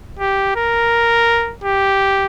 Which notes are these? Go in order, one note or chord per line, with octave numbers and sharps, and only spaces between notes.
G4
A#4
G4